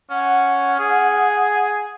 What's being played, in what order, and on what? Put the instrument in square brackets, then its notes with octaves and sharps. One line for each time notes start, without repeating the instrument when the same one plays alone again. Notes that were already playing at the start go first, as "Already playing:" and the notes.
[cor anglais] C#4 [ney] F#5
[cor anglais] G#4